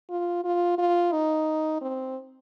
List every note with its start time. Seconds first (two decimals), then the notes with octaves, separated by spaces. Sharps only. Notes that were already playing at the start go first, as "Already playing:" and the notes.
0.10 F4
0.44 F4
0.78 F4
1.12 D#4
1.82 C4